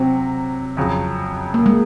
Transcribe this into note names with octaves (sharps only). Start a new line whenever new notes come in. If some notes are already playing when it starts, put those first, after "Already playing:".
Already playing: C3 F#3 C4
F2 C#3 F#3
A#3
G#3